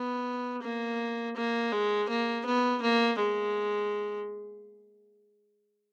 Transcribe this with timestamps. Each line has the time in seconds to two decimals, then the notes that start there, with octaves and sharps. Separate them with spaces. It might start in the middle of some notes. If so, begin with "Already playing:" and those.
Already playing: B3
0.62 A#3
1.36 A#3
1.72 G#3
2.09 A#3
2.46 B3
2.82 A#3
3.19 G#3